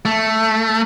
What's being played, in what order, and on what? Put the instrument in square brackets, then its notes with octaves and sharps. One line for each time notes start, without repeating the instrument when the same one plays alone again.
[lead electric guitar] A3